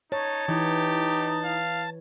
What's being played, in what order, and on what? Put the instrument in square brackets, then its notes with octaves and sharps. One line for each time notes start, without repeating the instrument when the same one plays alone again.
[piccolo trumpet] D#4 [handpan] C#5 [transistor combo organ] A5
[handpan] E3 [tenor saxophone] D#4 [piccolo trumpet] G4
[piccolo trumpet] F5